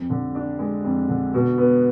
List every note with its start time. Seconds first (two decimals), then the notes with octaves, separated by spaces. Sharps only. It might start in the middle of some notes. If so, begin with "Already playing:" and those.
Already playing: F2
0.10 D3
0.35 D4
0.59 G#3
0.84 F2
1.09 D3
1.34 B2
1.58 B3